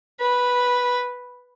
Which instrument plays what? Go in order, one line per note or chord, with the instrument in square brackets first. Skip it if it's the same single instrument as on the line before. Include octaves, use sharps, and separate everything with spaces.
[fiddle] B4